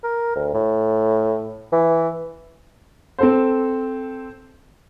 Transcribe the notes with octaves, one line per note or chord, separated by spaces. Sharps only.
A#4
D2
A2
E3
C4 A4 C5